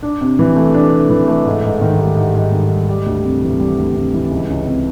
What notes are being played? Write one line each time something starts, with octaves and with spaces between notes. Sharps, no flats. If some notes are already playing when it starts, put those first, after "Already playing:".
D4
C3
E3
A3
D4
C3
E3
A3
G#2
G#2
D#3
G3
G#2
G#2
D#3
G3
G3
D2
C3
E3
G3
D2
C3
E3
C#2
C#2
C3